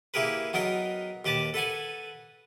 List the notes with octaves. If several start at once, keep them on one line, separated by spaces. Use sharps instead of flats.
A#3 E4 G4 G#4 A#4 B4
F#3 B3 D#4 A#4 G5 A#5
D#2 G4 B4 A5 D6
A4 B4 F#5 G#5